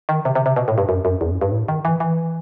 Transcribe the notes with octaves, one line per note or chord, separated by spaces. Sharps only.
D#3
C3
C3
C3
B2
A2
G2
F#2
F#2
E2
F#2
G2
A2
D#3
E3
E3